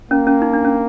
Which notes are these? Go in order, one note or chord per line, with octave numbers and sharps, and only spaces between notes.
A#3 C#4
C#4
D#4
D4
C#4